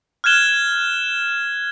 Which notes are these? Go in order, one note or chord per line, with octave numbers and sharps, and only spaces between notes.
F6 F#6 G#6 E7 G7